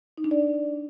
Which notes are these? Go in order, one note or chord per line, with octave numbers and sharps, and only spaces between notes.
D#4
D4
D5